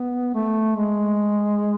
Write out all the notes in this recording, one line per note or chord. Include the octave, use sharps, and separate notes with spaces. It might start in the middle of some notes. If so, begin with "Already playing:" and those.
Already playing: B3
A3
G#3